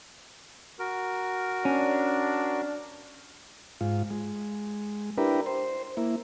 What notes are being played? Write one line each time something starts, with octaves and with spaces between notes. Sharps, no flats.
F#4 A#4
C#4 D4
G#2 F4
G#3
D4 E4 G4 A#4 B4
C5
A#3 E4